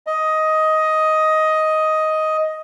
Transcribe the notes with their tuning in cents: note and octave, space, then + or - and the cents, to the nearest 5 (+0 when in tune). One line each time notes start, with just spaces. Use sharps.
D#5 +10